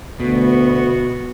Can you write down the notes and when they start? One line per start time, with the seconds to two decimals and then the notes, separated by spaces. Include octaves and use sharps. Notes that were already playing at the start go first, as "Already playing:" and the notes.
0.20 D2 B2 B3 F#4